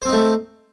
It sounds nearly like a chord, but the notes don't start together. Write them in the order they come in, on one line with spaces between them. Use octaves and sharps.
C5 C4 D#4 A3